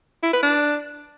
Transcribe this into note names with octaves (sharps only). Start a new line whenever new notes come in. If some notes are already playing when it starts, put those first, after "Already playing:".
E4
B4
D4